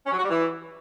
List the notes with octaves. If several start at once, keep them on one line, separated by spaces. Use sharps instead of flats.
C#4
F#3
F#4
G3
E3